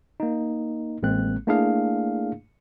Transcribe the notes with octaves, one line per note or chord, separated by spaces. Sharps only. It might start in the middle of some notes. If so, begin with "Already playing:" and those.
A#3 D#4
A1 G#3 A#3 C4 F#6
A3 A#3 D4 E4 G#4 F5